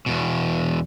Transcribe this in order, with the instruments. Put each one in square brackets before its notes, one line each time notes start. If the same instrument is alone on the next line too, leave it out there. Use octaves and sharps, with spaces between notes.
[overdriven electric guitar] E2 B2